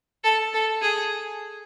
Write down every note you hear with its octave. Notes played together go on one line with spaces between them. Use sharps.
A4
A4
G#4